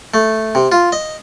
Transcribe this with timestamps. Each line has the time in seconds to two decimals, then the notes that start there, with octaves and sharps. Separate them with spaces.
0.14 A3
0.55 C3
0.72 F4
0.92 D#5